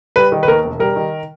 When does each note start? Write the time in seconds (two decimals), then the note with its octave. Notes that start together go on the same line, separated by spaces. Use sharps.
0.16 G3 B4
0.32 D#3
0.43 B4
0.48 D#2 A#4
0.64 E1
0.79 G3 A#4
0.96 D#3